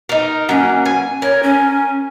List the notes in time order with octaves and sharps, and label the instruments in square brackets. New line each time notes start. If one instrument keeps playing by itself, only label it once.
[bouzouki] D#4 A#4
[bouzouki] F#3 A#3 [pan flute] C#4
[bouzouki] G#5
[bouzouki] A#4 [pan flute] C#5
[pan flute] C#4